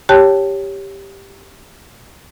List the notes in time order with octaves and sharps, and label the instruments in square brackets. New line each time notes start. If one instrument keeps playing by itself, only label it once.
[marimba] G4 C#5 G5 A5 F#6